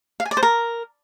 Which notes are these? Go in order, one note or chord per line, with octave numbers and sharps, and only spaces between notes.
F5
G#5
D5
C5
A#4